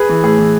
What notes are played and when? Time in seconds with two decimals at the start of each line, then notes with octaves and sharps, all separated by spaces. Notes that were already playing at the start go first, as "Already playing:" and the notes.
Already playing: G#4 B4
0.09 E3
0.24 A2 G#4
0.39 E3